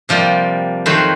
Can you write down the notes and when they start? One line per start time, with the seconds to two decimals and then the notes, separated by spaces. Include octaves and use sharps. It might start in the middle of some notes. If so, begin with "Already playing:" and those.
0.09 C3 F3 G3 A#3
0.86 F2 D#3 F#3 A3 C5 B5